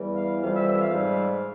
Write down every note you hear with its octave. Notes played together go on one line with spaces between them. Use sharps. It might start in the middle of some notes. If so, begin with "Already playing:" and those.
Already playing: E2 E3 G3
F5
F2 C3 E3 G3 F5
E5
E5
F5
G#2 G3